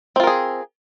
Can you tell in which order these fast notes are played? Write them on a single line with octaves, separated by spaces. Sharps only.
C4 F4 A#4 G#4